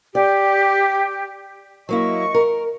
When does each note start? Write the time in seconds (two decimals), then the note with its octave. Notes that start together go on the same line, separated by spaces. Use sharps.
0.15 G4 D5
1.89 F#3 A#3 E4 D#5 C#6
2.34 A#4